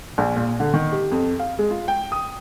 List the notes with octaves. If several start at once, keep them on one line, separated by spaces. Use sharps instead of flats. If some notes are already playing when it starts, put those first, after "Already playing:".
A#1
A#2
D3
D#3
G4
F2
F5
G#3
F4
G5
D#6